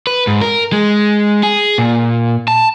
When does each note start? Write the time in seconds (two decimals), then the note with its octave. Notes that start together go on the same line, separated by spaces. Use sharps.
0.07 B4
0.27 G#2
0.41 A#4
0.72 G#3
1.43 G#4
1.78 A#2
2.48 A5